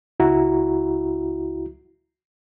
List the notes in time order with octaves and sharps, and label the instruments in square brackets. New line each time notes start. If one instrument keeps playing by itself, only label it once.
[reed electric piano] C#2 E4 F#4 A#5